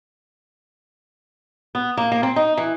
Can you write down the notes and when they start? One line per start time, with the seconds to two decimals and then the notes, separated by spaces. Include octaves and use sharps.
1.75 B3
1.97 A#3
2.12 A#3
2.23 C4
2.36 D#4
2.57 E3